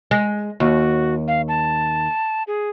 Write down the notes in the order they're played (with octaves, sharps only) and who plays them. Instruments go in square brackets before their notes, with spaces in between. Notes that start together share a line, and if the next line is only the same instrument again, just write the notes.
[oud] G#3
[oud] D#2 [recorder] F#4
[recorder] F5
A5
G#4